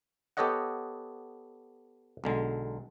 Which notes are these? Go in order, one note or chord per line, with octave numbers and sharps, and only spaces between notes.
B3 G4 A4 C#5 D#5 F#5
B1 D3 G#3